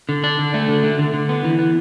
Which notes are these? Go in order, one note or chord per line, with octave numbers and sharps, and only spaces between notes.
D3
D4
D3
A3
D3
D3
D3
D3
B3
E3
B3